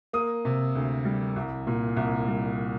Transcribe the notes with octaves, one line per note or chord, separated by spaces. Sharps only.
A#3 D#6
C3
D2
G3
C2
A#2
C2
G3